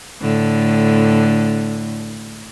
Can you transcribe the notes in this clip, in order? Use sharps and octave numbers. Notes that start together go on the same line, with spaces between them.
A2 D3